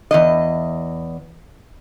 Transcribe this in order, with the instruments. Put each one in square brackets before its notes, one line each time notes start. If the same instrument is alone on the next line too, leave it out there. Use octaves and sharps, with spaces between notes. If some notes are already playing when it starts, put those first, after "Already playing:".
[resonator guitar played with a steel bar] E2 G#2 D#5